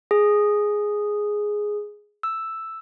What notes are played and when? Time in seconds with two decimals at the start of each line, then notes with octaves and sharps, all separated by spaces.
0.11 G#4
2.23 E6